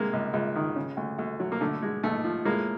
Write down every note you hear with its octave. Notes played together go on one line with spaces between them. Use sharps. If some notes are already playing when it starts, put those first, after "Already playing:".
Already playing: C3 G#3 A#3
C#2
C#2
D#3
C#3
D2
D2
F#3
A#3
D3 A3
G#3
D#2 A3
F3
A2 G#3 A#3